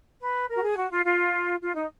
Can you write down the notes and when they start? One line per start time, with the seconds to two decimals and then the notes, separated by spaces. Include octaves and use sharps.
0.20 B4
0.49 A#4
0.56 F#4
0.63 G#4
0.77 F#4
0.91 F4
1.05 F4
1.61 F4
1.75 D#4